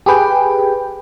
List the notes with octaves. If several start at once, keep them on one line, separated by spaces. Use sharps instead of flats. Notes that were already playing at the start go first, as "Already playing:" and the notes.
G4 G#4 B4 G5